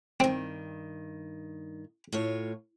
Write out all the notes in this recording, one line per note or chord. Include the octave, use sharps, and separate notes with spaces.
G2 D#3 C4
A2 F4 C#5